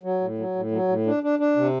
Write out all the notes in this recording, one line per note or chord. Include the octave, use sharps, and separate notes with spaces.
F#3
A2
F#3
A2
F#3
A2
D4
D4
D4
C3